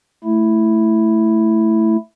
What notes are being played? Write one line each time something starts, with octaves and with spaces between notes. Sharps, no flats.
A3 E4